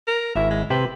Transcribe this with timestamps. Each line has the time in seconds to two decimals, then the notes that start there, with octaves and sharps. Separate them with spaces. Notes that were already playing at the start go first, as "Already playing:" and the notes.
0.07 A#4
0.36 G#1 E4 E5
0.50 G#3
0.70 C3 B4 C5 G5